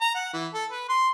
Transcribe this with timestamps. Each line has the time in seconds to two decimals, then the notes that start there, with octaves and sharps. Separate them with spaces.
0.01 A#5
0.15 F#5
0.33 E3
0.54 A4
0.71 B4
0.89 C6